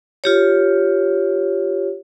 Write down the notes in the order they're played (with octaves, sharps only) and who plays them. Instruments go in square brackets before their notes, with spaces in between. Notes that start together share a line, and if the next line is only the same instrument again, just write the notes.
[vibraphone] F4 G4 C#5